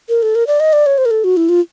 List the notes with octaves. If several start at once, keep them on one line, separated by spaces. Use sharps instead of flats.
A#4
A4
A#4
D5
D#5
D5
C#5
C5
A#4
A4
F#4
E4
F4